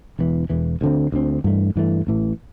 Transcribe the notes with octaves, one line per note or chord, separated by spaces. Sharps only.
E1 E2 E3
E1 E2 E3
D2 D3 C4
D2 D3 C4
G2 E3 A3
G2 E3 A3
A1 A2 E3